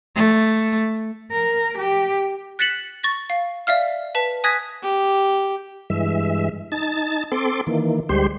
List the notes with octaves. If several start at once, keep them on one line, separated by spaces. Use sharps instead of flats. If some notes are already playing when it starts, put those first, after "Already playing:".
A3
A#4
G4
F#6 A6 B6 C#7 E7 F#7
C#6 A6 A#6
F5
D5 E5 F5 F6
B4 A5 B6
G#5 D#6 F#6 G#6 A#6 B6
G4
G2 E3 G#3 E5
D#4 A5 A6
C4 A4 C6 D6
D#3 E3 A#3
D2 G3 G#3 G4 C5 C6